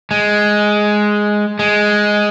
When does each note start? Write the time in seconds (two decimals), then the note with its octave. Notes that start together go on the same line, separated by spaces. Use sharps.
0.11 G#3
1.59 G#3